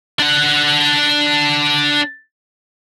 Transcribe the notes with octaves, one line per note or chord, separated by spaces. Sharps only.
D4 F#5